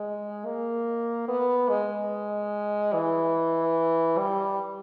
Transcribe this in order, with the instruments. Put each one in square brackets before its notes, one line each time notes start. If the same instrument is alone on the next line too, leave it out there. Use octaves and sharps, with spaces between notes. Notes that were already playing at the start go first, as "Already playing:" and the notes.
Already playing: [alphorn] G#3
A#3
B3
G#3
E3
G3